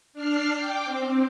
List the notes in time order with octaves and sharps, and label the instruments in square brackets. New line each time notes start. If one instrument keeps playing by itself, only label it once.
[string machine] D4 F6 C7
G5 D6
C4